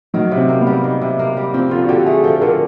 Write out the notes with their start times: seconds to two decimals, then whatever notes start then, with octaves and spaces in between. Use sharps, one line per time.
0.14 D#3 F#3
0.32 C3
0.37 C4
0.49 A#3
0.61 B3
0.67 G3
0.84 D#3
1.02 C3
1.19 A#3
1.37 G3
1.54 F3 C4
1.71 D3 F4
1.84 F#4
1.89 D3 G4
2.06 A3 G#4
2.24 F3 A4
2.41 D3 A#4